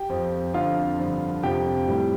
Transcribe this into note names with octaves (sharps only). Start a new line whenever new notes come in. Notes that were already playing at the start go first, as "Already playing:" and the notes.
Already playing: G4 G5
F2 F3
F2 D3 F3 F4 F5
G2 D3 F3
F2 C3 F3 G4 G5
A2 G3